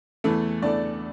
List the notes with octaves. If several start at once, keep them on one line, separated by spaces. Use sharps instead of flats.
E2 E3 A3 A4
E2 E3 A3 D4 D5